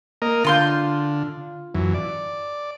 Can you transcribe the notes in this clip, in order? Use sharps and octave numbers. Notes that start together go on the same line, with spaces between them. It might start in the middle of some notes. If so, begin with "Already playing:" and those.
A#3 A#4 D#5
D3 F4 C6 G6
F#2 E3
D5